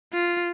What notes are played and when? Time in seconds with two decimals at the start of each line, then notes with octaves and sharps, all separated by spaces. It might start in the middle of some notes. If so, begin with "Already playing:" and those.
0.13 F4